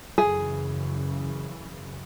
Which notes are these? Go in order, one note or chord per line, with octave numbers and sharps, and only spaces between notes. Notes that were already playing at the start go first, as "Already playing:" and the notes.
F#2 C#3 E3 G#4